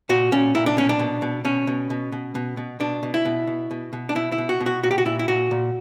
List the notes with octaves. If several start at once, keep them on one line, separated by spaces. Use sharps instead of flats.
A#2 F#4
A#2 C#4
A#2 E4
D4
B2 C#4
D4
B2
B2
B2 C#4
B2
B2
B2
B2
B2
B2 D4
B2
E4
B2
B2
B2
B2
D4
B2 E4
E4
B2
F#4
B2
F#4
A#2 F#4
G4
F#4
A#2 E4
E4
A#2 F#4
A#2